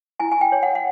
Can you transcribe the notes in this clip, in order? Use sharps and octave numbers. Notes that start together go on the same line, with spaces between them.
E4 G#5
G#5
G5
C#5
F#5
F#5